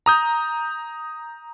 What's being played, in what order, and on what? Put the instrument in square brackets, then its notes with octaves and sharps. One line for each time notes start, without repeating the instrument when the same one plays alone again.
[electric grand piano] A#5 D#6 G6